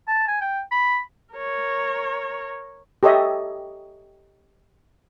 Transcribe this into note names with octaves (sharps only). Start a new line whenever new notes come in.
A5
G#5
G5
B5
A#4 C#5
G4 A4 C#5 D#5 E5